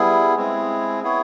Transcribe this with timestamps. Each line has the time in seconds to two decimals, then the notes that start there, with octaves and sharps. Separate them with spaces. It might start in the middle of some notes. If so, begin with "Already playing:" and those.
Already playing: G3 B3 E4 G#4
0.35 G#3 C4 E4 G#4
1.03 B3 E4 G#4 C#5